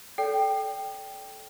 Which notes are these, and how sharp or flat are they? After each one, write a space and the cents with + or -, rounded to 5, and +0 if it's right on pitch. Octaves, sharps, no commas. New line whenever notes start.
A4 -20 D5 -40 G5 +0